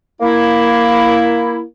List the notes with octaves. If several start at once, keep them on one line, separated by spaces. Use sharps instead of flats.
A#3 E4